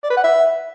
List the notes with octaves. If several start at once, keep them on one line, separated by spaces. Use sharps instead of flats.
D5
B4
F#5
E5